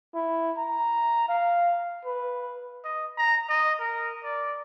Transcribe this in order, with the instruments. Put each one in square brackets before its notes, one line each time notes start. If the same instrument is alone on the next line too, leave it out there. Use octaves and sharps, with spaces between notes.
[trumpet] E4
A#5
F5
B4
[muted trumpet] D#5
A#5
D#5
A#4
D5